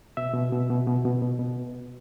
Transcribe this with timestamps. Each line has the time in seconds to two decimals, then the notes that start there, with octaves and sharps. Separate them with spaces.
0.17 B2 E5
0.34 B2
0.52 B2
0.70 B2
0.87 B2
1.05 B2
1.22 B2
1.39 B2